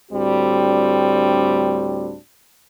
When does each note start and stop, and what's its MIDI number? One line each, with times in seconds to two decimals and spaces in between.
0.12 2.16 38
0.12 2.16 45
0.12 2.16 55
0.12 2.16 60
0.12 2.16 62
0.12 2.16 66